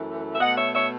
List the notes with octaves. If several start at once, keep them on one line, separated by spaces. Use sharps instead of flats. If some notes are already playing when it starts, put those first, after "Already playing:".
Already playing: F#2 E3 A3
E5
B2 A3 D#5 F#5
C#5 E5
C#5 E5